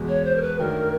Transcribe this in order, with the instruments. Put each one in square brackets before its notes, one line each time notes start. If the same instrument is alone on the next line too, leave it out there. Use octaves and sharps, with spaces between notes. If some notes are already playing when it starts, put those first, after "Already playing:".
Already playing: [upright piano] E2 B2 G#3
[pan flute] C#5
C5
A#4
B4
[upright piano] F#2 D#3 F#3 A3 D4 [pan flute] A#4